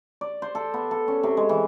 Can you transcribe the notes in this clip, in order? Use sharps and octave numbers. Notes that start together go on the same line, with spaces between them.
D5
C5
A4
B3
A4
C#4
C3
G#3
E3